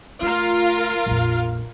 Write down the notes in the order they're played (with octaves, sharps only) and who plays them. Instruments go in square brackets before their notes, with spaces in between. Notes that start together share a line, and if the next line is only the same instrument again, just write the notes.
[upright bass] A3 [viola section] F4 A#4 F5
[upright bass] A#1 F2